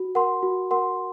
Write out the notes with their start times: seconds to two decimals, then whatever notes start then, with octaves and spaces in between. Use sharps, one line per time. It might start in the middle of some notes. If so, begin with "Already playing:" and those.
Already playing: F#4
0.15 A#4 F#5 C6
0.43 F#4
0.71 A#4 F#5 C6